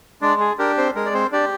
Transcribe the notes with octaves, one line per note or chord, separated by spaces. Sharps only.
G#3 D4 D5
G#4
D4 G4 A#4
C4 C5
G#3 A#4
D5
C4 C5
D4 G4 D5